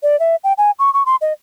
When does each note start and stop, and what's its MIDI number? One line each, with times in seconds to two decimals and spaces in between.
0.03 0.19 74
0.20 0.36 76
0.44 0.53 79
0.58 0.71 80
0.79 0.92 85
0.93 1.03 85
1.06 1.16 84
1.21 1.33 75